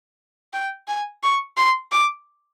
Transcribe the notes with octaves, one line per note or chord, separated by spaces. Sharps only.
G5
G#5
C#6
C6
D6